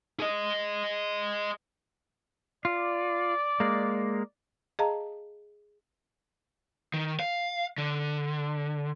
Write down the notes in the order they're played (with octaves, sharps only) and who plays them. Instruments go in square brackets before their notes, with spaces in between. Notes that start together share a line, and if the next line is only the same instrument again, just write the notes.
[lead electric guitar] G#4 D#5
[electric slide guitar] F4 [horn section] D5
[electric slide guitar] G#3 A#3
[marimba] G#4 D#5 F5 A5 A#5
[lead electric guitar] D#3
F5
D3